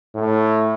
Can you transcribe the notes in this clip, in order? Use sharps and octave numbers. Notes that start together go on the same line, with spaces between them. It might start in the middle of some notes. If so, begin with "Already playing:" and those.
A2